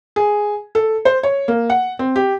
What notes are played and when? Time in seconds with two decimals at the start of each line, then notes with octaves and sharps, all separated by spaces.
0.16 G#4
0.75 A4
1.05 C5
1.23 C#5
1.48 A#3
1.70 F#5
1.99 C4
2.16 G4